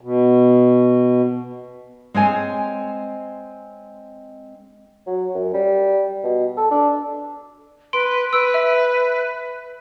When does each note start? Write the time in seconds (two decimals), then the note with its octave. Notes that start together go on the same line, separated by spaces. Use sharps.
0.01 B2
2.14 G#3 C4 C#5 G#5
5.07 F#3
5.35 F#2
5.54 G3
6.24 B2
6.57 A4
6.71 D4
7.93 B4 C6 D7
8.33 B4 E6 D7
8.54 E5